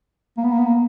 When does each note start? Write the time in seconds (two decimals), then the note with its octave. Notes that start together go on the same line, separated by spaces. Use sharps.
0.37 A#3
0.44 B3
0.52 A#3
0.59 B3
0.66 A#3